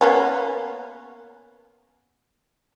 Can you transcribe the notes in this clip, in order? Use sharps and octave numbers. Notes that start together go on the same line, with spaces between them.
A#3 B3 C#4